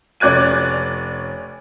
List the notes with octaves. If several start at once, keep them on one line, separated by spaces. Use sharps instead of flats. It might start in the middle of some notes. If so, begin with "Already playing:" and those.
F1 C#4 D5 F#6 G#6 D#7